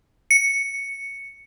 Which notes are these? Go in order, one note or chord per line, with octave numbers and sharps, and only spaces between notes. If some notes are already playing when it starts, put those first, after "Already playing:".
C#7